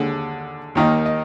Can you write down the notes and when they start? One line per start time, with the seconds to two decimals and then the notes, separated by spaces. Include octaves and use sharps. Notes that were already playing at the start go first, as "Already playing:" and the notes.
Already playing: D#2 D3 G#3
0.75 D#2 D#3 A#3 D#4
1.06 D#5